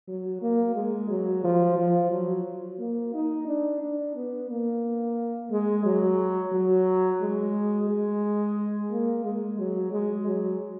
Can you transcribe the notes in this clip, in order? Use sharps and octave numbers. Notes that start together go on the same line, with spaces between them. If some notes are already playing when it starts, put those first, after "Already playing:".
F#3
A#3
G#3
F#3
F3
F3
F#3
A#3
D#4
D4
D4
B3
A#3
G#3
F#3
F#3
G#3
G#3
A#3
G#3
F#3
G#3
F#3